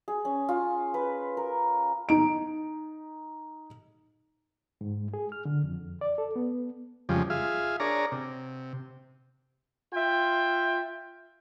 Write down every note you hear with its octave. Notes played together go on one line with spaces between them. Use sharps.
G#4
C#4
F4
B4
A#4
D#4 D7
G#2
G#4
F6
D3
F2
D5
A4
B3
F2 C#3 F3 G3 G#3
F4 G#4 E5 F5
D4 G#4 A#4 C#5 D5 A#5
C3
F4 E5 G5